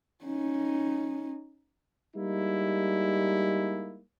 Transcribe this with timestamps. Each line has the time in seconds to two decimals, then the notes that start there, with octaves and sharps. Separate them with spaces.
0.24 C#4 D#4
2.16 G3 G#3 A#3 D#4 E4